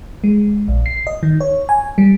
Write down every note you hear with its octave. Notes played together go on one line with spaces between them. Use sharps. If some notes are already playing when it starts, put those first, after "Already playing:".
G#3
A#1
C7
D#5
D#3
C#5
G#5
G3